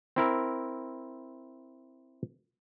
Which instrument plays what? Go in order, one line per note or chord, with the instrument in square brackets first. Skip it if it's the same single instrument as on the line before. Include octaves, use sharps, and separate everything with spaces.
[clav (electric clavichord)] C4 E4 A#4